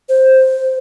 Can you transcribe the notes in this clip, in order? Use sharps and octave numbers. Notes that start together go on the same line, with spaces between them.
C5